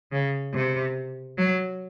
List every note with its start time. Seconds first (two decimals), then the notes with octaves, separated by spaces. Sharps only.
0.12 C#3
0.54 C3
1.38 F#3